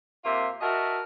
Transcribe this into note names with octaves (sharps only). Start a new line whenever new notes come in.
C3 A#3 F4 E5 C6
F#4 A#4 D#5 E5 A5